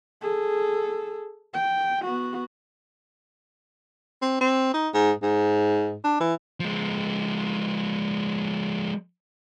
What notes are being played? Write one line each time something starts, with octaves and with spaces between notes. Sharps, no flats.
G#4 A4
G5
B3 F#4
C4
C4
D#4
G#2
G#2
D4
E3
F3 G#3